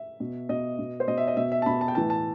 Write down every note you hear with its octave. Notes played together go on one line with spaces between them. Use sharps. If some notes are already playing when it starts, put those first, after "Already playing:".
Already playing: E5
B2
B2 D#5
B2
C5
B2 D#5
E5
D#5
B2 E5
E5
A5
B2 B5
A5
G5
A2 E3 A5
A5